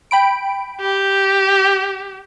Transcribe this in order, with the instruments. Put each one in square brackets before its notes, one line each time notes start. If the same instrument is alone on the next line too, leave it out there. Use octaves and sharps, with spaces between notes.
[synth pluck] G5 B5 D7
[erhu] G4